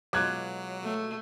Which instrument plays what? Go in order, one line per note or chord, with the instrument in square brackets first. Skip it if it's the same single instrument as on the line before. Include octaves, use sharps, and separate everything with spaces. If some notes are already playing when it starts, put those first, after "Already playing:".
[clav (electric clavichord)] B2 G#3 F4 [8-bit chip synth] F#3 [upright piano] D6 F#6 G#6
[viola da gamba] A3